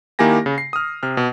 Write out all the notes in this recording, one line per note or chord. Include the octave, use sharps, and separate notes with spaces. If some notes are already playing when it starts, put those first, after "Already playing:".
D#3 A#3 E4 G4 G#5 A#6
C#3
C7
D#6 F6
C3 F6
B2